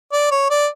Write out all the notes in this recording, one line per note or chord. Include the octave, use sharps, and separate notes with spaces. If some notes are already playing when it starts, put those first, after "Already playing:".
D5
C#5
D5